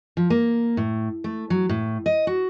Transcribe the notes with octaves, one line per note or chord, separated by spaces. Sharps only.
F3
A#3
A2
A3
F#3
A2
D#5
F#4